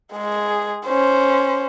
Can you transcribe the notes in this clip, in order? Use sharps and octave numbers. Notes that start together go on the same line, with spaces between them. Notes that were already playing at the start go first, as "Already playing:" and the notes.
G#3 G#4
C#4 C5